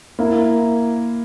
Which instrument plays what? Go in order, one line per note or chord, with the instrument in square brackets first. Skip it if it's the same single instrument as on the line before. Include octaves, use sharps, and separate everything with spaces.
[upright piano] A#3 E4 A#4